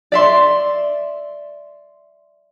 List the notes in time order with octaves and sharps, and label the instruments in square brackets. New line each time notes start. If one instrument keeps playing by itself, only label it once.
[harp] D5 E5 C6